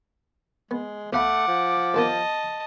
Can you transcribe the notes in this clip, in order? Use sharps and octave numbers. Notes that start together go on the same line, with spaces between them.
G#3 B3
B1 A3 F5 F#5 B5 D6
F3
G2 D#3 B3 D#5 A5